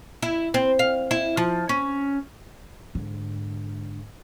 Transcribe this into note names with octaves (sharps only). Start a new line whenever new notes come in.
E4
C4
F5
E4
F3
C#4
G#2 D3